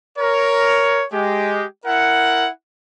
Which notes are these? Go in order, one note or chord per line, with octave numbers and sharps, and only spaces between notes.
A#4 C#5
G#3 G4
E4 A#4 F#5